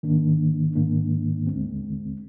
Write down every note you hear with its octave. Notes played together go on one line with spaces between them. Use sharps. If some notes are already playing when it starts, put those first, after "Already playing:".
G#2 D#3 A#3 D4
G#2 D#3 A#3 D4
D2 D3 G#3 C4